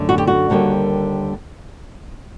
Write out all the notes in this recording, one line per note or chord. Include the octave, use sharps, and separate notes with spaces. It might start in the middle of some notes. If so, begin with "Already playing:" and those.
Already playing: F#2 D3 A3
F#4
G4
F#4
D#2 D3 G3 A#3